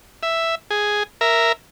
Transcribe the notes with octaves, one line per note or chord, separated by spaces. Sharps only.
E5
G#4
A#4 E5